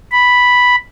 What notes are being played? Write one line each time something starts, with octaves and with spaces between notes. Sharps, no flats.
B5